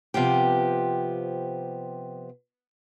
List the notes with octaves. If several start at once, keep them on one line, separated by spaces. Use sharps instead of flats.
C3 F3 B3 G4